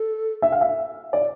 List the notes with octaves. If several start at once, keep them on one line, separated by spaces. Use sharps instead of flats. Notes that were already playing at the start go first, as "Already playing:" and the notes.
Already playing: A4
E5
F5
E5
D5